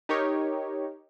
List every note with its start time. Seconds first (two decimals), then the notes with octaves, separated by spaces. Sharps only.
0.09 D#4 G4 A#4 C#5